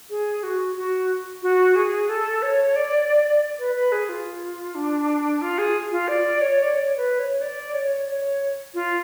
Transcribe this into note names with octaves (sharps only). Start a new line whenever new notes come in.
G#4
F#4
F#4
F#4
G#4
A4
C#5
D5
B4
B4
G#4
F4
D4
F4
G#4
F4
D5
C#5
D5
C#5
B4
C#5
D5
C#5
C#5
F4